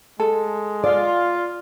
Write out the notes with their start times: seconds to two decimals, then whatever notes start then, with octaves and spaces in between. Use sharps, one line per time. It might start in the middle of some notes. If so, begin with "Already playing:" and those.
0.20 G#3 A4
0.84 F4 D5